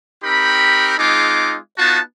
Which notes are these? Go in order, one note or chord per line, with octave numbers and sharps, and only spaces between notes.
C4 D#4 G4 A#4 B5
G#3 C4 D#4 F4 G#4 D6
B3 D#4 F4 F#4 A5